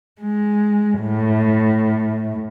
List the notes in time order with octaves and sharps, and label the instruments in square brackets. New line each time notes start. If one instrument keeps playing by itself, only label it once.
[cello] G#3
A2